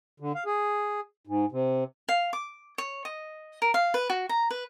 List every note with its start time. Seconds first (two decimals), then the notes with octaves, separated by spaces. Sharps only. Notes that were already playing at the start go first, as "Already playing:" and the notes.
0.20 D3
0.35 F5
0.46 G#4
1.27 G#2
1.52 C3
2.09 F5
2.33 D6
2.78 C#5
3.05 D#5
3.62 A#4
3.74 F5
3.94 B4
4.10 F#4
4.29 A#5
4.50 B4